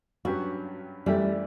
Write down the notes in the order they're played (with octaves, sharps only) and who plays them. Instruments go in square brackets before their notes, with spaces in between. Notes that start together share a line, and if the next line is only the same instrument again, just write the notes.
[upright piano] G2 F#3 C#4 G4 B4 [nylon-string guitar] F#4
[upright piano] F#2 E3 A3 E4 G4 [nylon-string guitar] G3